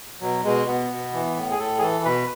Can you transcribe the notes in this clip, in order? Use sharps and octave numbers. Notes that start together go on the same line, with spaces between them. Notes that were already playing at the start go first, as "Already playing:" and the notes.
B2 F#3
B2 G#3
B2 B3
B2
E3
A2
G#4
A2 A4
G#4
E3 A4
B2 B4